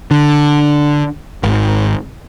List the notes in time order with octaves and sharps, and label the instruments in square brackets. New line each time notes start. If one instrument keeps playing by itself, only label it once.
[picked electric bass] D3
G#1